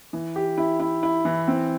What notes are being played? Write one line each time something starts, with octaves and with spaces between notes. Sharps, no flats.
E3
G4
E4
E4
E4
E3
C4